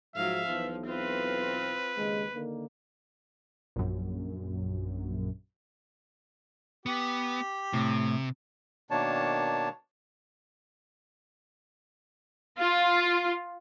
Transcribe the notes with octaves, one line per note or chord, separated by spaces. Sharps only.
G#2 F3 F#3 E5 F5
B1 E3 F3
C4 F4 B4
D#2 C#3 G#3
D3 D#3 A#3
A#1 F#2
B3 G4
A2 C3
B2 D#3 A#3 D4 C#5 A5
F4